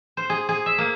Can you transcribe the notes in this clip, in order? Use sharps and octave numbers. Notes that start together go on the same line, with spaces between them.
C5
G#4
G#4
E5
A#3